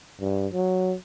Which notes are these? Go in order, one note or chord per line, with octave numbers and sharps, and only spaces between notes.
G2
F#3